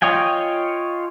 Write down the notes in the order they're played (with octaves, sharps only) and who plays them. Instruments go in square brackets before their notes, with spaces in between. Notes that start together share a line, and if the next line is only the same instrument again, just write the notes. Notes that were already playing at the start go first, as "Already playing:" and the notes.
[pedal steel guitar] F4 C#5 D#5 G5 G#5